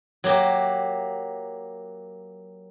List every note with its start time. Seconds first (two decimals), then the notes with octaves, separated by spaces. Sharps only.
0.24 F#3 A#3 G4